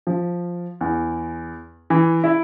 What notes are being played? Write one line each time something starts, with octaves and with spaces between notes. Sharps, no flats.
F3
E2
E3
E4